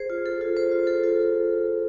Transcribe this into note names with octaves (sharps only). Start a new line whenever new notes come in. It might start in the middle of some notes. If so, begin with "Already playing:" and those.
Already playing: G#4 C5
F4
A4
F4
C5
F4
A4
F4